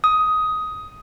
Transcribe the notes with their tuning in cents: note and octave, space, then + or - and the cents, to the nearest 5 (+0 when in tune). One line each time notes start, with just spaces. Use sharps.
D#6 +10